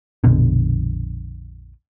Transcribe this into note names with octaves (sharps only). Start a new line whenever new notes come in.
A#1 F2 B2 D3